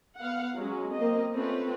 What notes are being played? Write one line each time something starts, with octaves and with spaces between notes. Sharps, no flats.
B3 F5 F#5
F#3 G#3 C#4
A#3 C4 D#5
A3 C4 C#4 F4 B4